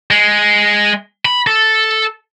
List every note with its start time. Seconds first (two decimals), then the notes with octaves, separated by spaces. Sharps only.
0.11 G#3
1.25 B5
1.47 A4